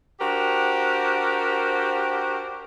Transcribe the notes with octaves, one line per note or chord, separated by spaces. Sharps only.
D4 F#4 G4 A#4 C5